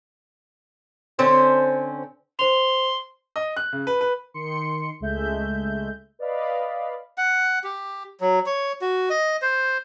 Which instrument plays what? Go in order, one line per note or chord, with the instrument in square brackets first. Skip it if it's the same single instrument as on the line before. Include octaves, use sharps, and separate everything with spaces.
[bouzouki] D3 C4 C#4 C5
[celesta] C5 F7 [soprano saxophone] C6
[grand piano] D#5
F#6
C#3
B4
B4
[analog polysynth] D#3 C6 C#7
C#2 G#3 A3 E5 G6
B4 D5 D#5 F5 B5
[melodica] F#5
G4
F#3
C#5
F#4
D#5
C5